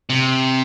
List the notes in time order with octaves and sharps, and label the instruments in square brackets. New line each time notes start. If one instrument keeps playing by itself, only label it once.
[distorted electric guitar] C3